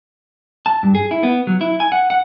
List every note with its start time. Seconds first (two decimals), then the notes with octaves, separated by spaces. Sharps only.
0.66 A5
0.83 G2
0.95 G#4
1.11 E4
1.23 B3
1.47 F#3
1.61 E4
1.80 G#5
1.92 F#5
2.10 F#5